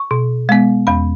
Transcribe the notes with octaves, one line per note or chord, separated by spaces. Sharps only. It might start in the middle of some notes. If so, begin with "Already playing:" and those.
Already playing: C#6
B2
G#3 B3
E2 B5